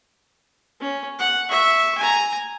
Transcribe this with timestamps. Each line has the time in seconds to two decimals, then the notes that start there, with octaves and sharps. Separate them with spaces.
0.80 C#4
1.19 F#5
1.49 E5 C#6
1.98 G#5 A#5